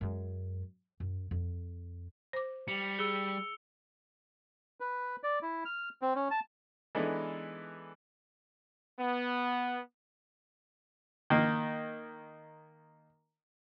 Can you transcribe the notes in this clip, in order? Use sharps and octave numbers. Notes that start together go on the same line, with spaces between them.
F#2 G#3
F#2
F2
C5 D6
G3 C#7 F7
G#4 E6 C#7 G7
B4
D5
E4
F6
C4
C#4
A5
E3 G#3 B3 D4 D#4 A4
B3
D#3 A#3